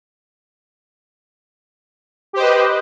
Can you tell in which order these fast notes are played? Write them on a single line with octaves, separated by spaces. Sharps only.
G4 C5 D#5 B4